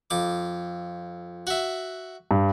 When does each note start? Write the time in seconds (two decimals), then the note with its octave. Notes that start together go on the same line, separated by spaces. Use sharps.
0.10 F2 D6
1.47 F#4 E5
2.31 G2